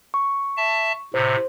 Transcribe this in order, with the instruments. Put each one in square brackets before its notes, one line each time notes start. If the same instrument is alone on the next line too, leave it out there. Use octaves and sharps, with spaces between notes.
[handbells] C#6
[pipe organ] E5 A5
[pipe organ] A2 C3 [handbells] C5